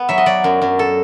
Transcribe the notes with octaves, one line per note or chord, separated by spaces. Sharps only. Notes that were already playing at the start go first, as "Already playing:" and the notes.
Already playing: B3
F#3 E5
D#5
F#3 D5
F#2
F#2
A4